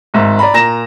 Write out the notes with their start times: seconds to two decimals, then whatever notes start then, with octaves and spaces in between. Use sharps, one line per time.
0.14 G#1 G#2 E5
0.39 D5 A#5 B5
0.54 A#2 A#5 A#6 E7